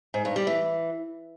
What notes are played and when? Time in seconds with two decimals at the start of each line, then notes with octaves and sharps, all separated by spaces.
0.14 G#2
0.25 G2
0.36 G3
0.47 E3